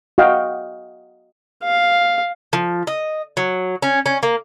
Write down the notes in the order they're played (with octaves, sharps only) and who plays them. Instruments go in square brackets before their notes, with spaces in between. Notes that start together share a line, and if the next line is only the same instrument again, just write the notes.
[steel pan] F#4 D#5 F5 G5
[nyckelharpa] F5
[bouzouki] F3
D#5
F#3
C#4
C#4
A#3